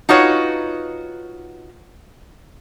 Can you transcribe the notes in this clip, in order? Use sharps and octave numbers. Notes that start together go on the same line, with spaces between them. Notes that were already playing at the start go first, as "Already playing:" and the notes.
D#4 F4 F#4 B4 C#5